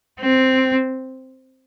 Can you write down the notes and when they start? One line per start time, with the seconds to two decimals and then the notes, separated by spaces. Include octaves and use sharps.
0.21 C4